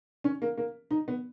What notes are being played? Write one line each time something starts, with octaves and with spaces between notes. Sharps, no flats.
C#4
A#3
A#3
D#4
B3